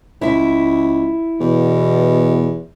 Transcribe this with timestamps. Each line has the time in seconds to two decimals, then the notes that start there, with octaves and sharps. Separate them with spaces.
0.21 C#2 E4 E5
1.41 E2 B2